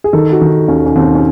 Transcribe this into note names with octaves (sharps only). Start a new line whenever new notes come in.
G#4
D#3 A4
F#4
D#3
D#2 C#4
C#4
D#2 C4
C#4